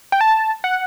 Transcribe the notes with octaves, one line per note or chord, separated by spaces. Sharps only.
G5
A5
F#5